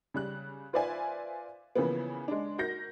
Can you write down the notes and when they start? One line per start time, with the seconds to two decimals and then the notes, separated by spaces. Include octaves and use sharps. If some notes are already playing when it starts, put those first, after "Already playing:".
0.14 C#3 G3 F#6
0.73 F4 B4 C5 D5 E5 G#5
1.75 C#3 E3 F3 A#3 B3
2.28 G#3 D4
2.58 F#4 A#4 G6 A#6